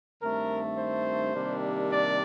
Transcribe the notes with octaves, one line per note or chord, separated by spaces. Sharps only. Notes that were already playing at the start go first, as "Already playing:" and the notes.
G2 D#3 A3 C4 A#4
C5
C3 D#3 G3 A#3 D4
D5